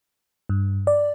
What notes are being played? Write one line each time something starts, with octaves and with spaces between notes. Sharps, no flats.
G2
D5